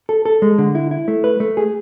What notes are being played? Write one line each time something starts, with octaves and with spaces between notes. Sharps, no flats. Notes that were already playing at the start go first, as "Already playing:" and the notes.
A4
A4
G#3
D3
E4
E4
A3
B4
A3
G#4